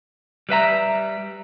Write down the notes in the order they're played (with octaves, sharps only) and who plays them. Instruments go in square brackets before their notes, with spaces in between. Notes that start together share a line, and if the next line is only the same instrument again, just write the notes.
[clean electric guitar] G3 B4 E5 A#5